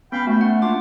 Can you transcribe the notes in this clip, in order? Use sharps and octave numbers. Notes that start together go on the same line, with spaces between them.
B3 C#4 F5 G5 B5
A3 F#4
F#5
A#3 D4 F4 D6